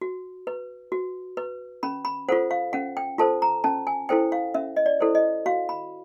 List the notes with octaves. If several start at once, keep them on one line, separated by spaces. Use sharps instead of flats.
F#4
B4
F#4
B4
C#4 B5
B5
F4 A4 C5 F#5
F5
C#4 F#5
G5
F4 A4 C5 A5
A#5
C#4 A5
G#5
E4 A4 C5 G5
F5
C#4 E5
D#5
D5
E4 A4 C5
D#5
F#4 F5
B5